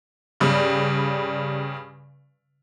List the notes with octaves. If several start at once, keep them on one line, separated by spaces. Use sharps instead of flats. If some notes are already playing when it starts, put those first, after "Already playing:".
G2 C#3 G3